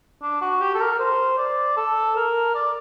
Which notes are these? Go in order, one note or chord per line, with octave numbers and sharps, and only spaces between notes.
D4
F#4
G4
A4
A#4
C5
D5
A4
A#4
D5